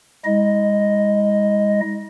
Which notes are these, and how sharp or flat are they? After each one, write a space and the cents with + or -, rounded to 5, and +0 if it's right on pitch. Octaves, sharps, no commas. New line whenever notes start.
G#3 -35 D#4 +45 D#5 +0